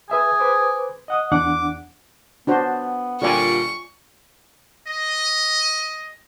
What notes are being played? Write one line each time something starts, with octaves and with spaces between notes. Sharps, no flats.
G#4 B4 E5 G#5
B4 C5 D6
D#5 F#5 D#6
E2 D4 F#5 D6
B3 D4 F#4 C5
A#2 D3 G3 F4 D5 G#5 C#6
D#5